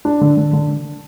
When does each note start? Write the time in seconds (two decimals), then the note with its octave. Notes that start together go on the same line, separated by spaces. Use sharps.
0.05 D4
0.21 D3
0.37 D3
0.53 D3